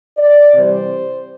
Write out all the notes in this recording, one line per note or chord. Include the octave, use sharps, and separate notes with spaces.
D5
C3 E3 G3 C5